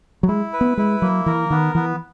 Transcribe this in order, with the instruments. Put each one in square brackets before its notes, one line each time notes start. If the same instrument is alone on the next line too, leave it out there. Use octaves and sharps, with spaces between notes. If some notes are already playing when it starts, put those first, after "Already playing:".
[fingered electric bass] F#3
[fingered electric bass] G#3 [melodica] E4
[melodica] B4
[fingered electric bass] B3
[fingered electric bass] G#3 [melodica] E4
[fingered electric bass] F#3 [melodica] A#3
[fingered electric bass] E3 [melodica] A#4
[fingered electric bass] D#3 [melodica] B3
[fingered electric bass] E3 [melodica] B3